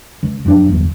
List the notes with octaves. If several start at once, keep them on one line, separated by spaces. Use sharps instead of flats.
C#2
F1 F#2 D3 D4
D1 G1 E2